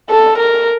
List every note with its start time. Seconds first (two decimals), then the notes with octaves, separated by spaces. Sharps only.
0.10 A4
0.38 A#4